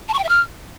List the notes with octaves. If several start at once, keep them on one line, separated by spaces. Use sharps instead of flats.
A5
C#6
G5
E5
F6